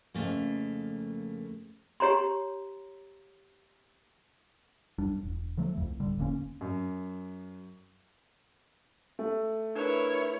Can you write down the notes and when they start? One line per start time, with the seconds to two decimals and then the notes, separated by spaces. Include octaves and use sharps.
0.14 F2 C#3 A3 A#3
2.00 G4 C#5 A#5 C6
4.98 B1 F#2 G3 D4
5.23 E1
5.57 D3 F3 F#3 A3
5.77 C2 F2
6.00 D1 D3 G3
6.18 F1 D3 A#3 C#4
6.61 F#2
9.19 A3
9.75 D4 E4 A#4 B4 C#5